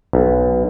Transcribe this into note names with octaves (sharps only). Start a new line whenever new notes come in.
B1